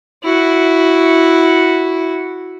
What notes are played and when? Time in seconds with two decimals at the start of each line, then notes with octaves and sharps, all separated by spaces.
0.23 E4 F#4